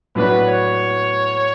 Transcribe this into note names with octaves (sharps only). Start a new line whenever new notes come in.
A2 F#3 B3 D4 F#4 B4
C#5